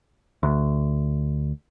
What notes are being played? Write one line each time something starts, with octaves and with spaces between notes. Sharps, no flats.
D2